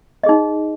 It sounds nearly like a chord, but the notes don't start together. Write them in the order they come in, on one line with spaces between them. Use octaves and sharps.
D#5 G#4 D#4